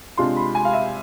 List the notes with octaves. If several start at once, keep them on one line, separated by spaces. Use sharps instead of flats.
C3 G#3 D4 F4 C6
B5
G#5
F5
E5